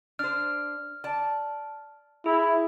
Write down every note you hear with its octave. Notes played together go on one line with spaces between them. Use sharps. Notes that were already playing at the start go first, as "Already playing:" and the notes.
D4 C5 F6
D5 A5
E4 G#4